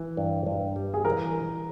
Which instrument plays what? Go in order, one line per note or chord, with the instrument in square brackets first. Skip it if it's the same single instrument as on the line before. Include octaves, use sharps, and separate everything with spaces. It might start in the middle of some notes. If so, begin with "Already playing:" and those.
Already playing: [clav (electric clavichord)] E3
G2
G2
G3
[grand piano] G#4
[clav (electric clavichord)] E3 [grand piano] A#4